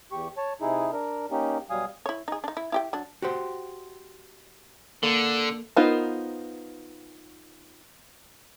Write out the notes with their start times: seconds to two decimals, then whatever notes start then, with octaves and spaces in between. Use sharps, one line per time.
0.12 E2 G4 C#6
0.37 C#5 A5
0.61 C3 D#4 E4 G#4
0.92 D4 A#4
1.31 A#3 C#4 D#4 G4
1.70 B2 F#3 G3 F5 G#5 D#6
2.06 E4 C#5
2.28 D#4 G#4
2.44 D4 D#4
2.57 E4
2.72 E4 G4 G5
2.93 F#3 D4
3.22 F#4 G4 C5
5.03 D3 A#3 A4
5.77 B3 D#4 F4 A#4 C5